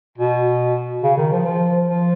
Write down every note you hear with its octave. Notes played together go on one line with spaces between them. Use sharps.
B2
C#3
D#3
F3
F3
F3